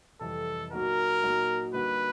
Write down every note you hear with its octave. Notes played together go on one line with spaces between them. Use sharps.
F2 C3 E3 G3 A4
A#2 F#3 A#3 D#4 F#4 A#4
A#2 F#3 A#3 D#4 F#4
D3 G3 A#3 D#4 F#4 B4